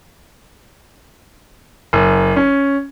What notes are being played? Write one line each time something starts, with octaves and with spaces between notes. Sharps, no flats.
F#1
C#4